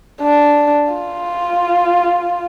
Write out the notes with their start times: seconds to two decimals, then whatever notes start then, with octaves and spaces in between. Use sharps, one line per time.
0.21 D4
0.93 F4